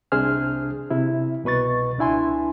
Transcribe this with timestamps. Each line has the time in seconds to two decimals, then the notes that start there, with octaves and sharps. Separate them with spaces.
0.12 C2 C3 D4 G#4 C5 F6
0.90 C3 E4
1.44 C2 B2 B4 C#6 A6
1.98 C#2 D4 E4 G#5 C6